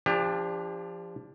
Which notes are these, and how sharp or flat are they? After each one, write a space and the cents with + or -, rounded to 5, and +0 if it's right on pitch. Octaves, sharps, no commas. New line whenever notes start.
F3 -15 D4 +0 G4 +35